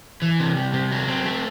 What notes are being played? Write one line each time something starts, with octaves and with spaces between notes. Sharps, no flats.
E3
C3
G3
C3
F#3
C4
A3